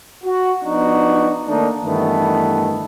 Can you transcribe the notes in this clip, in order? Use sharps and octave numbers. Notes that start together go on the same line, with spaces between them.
F#4
F3 B3 D4 D#4 F#4
D#3 A3 A#3 D4 D#4
G2 D#3 E3 A3 B3